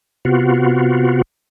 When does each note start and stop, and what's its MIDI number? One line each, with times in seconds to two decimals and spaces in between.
0.25 1.22 48
0.25 1.22 59
0.25 1.22 65
0.25 1.22 66